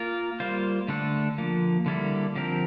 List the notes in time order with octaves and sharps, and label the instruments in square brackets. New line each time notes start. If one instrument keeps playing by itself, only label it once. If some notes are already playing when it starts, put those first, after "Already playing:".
Already playing: [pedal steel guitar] A#3 F4 A#4
G3 A#3 F4 C5
D3 A3 D4 A4
D3 F3 A#3
D3 G3 A#3 E4 A4
D3 F3 C4 G4 A#4